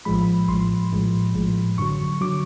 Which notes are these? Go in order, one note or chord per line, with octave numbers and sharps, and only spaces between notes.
A#1 A2 F3 G#3 B5
A#1 A2 F3 G#3 C6
A#1 A2 F3 G#3
A#1 A2 F3 G#3
F#2 D3 F#3 C#6
D3 F#3 D6